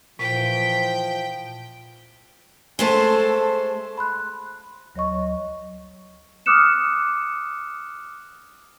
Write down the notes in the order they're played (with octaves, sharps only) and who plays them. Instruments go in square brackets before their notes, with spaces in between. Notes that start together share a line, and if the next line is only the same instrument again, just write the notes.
[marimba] A#2 [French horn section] E3 F3 [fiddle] G5 [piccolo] B6
[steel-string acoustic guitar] G#3 A3 C5 [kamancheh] A4
[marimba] B5 C6 F#6
D2 F#3 C#5 D#5 C#6
[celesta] D6 D#6 F6 F#6 C#7 E7